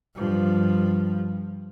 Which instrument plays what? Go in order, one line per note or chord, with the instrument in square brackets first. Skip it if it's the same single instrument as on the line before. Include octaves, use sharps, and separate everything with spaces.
[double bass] G2 F3